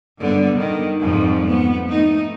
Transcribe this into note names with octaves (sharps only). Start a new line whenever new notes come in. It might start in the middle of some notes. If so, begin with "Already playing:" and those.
G2 D3 B3 D4
D#3
F2 G#2 F3 G3
B3
A3 D#4